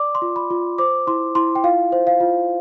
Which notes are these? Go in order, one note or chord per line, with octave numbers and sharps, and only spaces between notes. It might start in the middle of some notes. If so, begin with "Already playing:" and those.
Already playing: D5 D6
C6
F4
B5
F4
C5 D6
E4 C6
E4 C6
G5
F4 F5
C5
F5
F4